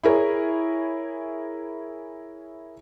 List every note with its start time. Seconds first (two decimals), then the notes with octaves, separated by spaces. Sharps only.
0.03 E4 G#4 A#4 C#5